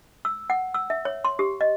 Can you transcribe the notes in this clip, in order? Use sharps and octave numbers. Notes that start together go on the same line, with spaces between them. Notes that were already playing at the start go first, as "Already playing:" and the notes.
E6
F#5
E6
E5
C#5
C6
G4
D#5